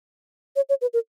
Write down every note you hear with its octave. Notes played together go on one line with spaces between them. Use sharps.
C#5
C#5
B4
A#4